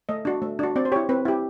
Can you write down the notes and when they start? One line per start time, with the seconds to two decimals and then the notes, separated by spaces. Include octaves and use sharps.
0.09 A3 D#5
0.25 D4 F#4
0.42 A3
0.59 D4 F#4
0.76 C4 D5
0.85 C5
0.92 E4 G4 C#5
1.09 C4 B4
1.25 E4 G4